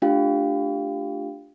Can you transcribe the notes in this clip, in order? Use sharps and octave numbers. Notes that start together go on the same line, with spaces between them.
A3 D4 F4 G4 F5 G5